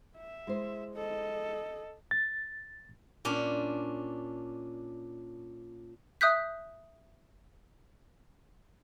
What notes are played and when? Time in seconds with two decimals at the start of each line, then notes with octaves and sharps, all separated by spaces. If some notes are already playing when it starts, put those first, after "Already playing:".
0.17 E5
0.47 G#3 E4 C5
0.96 A4 D#5
2.11 A6
3.25 A#2 C#4 D4
6.21 E5 D#6 F#6 G6 B6